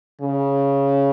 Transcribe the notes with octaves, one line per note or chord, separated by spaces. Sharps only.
C#3